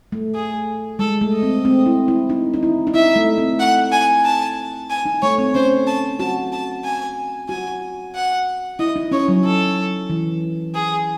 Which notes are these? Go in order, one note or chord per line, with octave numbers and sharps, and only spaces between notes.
A3
G#4
G#3 A4
A3
D#5
C4
C4
E4
E4
D#4
D#4
E4
D#4
E4 E5
A3
C4
F#5
G#5
A5
G#5
D#4
A3 C#5
C4
C#4 C5
A5
F#4 A5
A5
G#5
F#4 G#5
F#5
E4 D#5
D#4
C#4 C#5
F#3
A4
E3
G#4